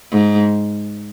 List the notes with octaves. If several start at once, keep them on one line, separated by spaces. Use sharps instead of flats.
G#2